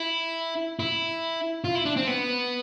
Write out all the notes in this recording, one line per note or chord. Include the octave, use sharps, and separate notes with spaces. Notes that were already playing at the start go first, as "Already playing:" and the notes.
Already playing: E4
E4
F4
E4
D4
C4
B3